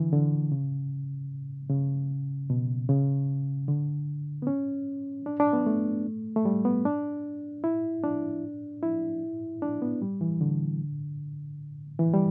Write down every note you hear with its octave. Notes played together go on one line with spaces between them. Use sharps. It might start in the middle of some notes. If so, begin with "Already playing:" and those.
Already playing: D3 E3
D3
C#3
C#3
B2
C#3
D3
B3
C#4
D4
D4
B3
A3
A3
G3
B3
D4
E4
D4
E4
D4
B3
G3
E3
D3
E3
G3